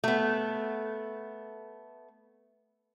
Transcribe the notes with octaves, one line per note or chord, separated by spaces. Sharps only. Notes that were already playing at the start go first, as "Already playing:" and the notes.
A3 B3